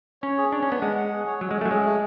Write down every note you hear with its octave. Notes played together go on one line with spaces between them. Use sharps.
C#4 C#5
G#4
D4 C#5
C#4
D4
B3
G#3 F#5
F#5
G#4
C#5
F#3 C#4
G#3
A3 C#4
F#3
G#3 G#4
A3